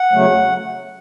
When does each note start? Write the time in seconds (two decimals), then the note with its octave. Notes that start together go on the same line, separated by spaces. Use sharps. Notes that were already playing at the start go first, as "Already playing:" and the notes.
Already playing: F#5
0.12 E2 C#3 F#3 A3